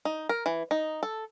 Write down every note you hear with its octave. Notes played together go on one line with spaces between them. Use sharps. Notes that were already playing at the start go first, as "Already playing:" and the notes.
D#4
A#4
E3
D#4
A4